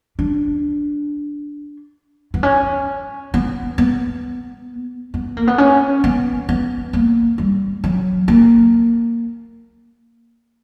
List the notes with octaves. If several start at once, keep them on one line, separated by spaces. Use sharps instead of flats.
D4
B3
C#4
B3
B3
B3
A#3
B3
C#4
B3
B3
A#3
G3
F#3
A#3